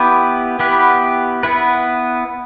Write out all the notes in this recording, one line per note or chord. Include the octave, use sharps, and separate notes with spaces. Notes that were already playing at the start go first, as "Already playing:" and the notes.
Already playing: B3 E4 G4 B4
B3 E4 G4 B4
B3 E4 B4